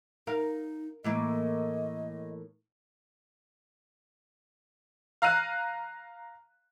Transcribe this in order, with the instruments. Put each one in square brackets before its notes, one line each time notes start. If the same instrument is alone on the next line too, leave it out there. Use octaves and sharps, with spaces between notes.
[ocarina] D#4 [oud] A#4 F5
[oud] A2 E3 A#3 [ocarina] D#5
[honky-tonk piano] F5 A#5 F6 F#6 D#7